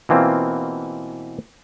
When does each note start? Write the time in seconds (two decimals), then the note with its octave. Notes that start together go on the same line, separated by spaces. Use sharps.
0.09 B2 E3 A#3 C4 F4